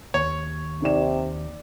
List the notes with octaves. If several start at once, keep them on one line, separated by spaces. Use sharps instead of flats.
D#2 C#5
C3 D#4 D5 E7